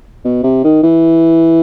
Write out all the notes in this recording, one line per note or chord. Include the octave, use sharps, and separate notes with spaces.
B2
C3
D#3
E3